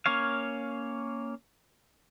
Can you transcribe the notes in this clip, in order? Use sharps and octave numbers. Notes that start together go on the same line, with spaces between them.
A#3 C#4 C#5 F5